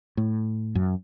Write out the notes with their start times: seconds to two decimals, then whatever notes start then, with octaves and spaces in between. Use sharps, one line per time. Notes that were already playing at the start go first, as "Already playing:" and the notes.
0.17 A2
0.75 F#2